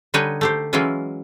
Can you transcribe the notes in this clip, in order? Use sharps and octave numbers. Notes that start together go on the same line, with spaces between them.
D3 G3 D#4 B4 C#5
A3 G4 C5
E3 F#3 G#3 C#4 E4 F4